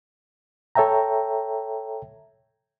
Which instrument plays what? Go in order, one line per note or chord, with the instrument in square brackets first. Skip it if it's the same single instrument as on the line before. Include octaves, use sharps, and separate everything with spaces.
[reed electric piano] A4 C#5 E5 G5 A#5